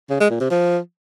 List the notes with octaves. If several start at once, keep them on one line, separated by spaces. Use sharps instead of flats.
C#3
G#3
A#2
C3
F3